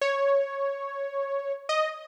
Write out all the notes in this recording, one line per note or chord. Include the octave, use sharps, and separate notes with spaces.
C#5
D#5